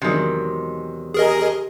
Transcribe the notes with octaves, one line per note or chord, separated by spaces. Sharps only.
E2 C3 D#3 F#3 G#3
G4 G#4 A#4 D#5